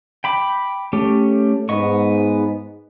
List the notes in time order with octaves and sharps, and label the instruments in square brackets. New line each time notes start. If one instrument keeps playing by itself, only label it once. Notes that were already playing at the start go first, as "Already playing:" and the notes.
[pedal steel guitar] G5 B5 D6
A3 C#4 G4
[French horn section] G#2 [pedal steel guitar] B3 D#5 C#6